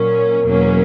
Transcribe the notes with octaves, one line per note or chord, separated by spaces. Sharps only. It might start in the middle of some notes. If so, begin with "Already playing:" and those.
Already playing: A#2 F#3 C#4 A#4
E2 B2 F#3 A#3 C#4